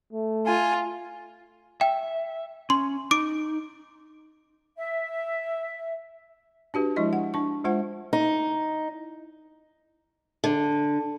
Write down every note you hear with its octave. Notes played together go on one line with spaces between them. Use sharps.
A3
F4 G#5
E5 G5
C#4 C6
D#4 D6 D7
E5
D4 F#4 G4 B4
F3 G#3 E4 D#5
F#5
D4 C#6
G#3 F4 C5 F#5
D#4
D3